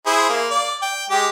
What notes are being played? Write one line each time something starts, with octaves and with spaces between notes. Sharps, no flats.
E4 G#4 C5
A#3
D5
G5
G#3 G4